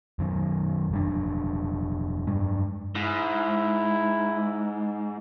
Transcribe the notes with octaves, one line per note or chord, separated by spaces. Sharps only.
F#2 D#3
F1 G3 D4
G2 G#3 D4
G#2 E4